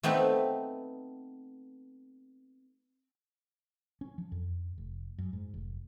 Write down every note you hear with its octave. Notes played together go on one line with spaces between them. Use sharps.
A3 B3 C4 D#4 B4
C#4
F3
F2
F1
F#2
G#2
F1